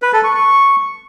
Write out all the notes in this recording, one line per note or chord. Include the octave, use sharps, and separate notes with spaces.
B4
A4
C#6
C#6